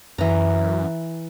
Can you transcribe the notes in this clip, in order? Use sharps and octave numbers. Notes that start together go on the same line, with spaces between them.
F#2 E3 A#5